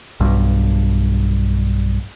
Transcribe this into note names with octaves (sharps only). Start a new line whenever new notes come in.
B1 G2